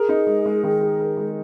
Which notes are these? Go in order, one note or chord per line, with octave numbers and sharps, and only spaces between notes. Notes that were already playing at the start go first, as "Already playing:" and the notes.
Already playing: G#4 A#4
D#4
G#3
G#3
D#3
G#3
A#4
G#3